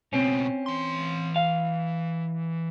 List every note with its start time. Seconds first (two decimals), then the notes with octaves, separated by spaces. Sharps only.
0.13 C#2 B2 C4 C#4
0.66 E3 C6
1.36 F5